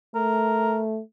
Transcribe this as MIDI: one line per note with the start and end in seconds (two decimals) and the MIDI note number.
0.15 1.00 57
0.15 0.80 70